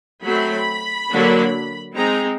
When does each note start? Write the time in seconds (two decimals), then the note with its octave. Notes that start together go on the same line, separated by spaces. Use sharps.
0.24 F#3 A3 C4 B5
1.10 D3 F#3 A#3 D4
1.95 G#3 C4 D#4 A#5